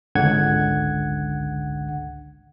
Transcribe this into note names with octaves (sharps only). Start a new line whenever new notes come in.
G#1 C#2 D3 F#5 G#6